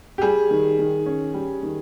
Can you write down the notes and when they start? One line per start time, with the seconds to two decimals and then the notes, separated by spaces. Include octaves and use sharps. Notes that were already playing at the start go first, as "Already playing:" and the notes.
0.18 G4
0.22 G3 G#4
0.51 D#3
0.79 D#3
1.06 C#4
1.34 G3
1.63 D#3